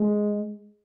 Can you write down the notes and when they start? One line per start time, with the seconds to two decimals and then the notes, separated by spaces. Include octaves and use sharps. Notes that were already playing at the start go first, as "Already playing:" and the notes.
Already playing: G#3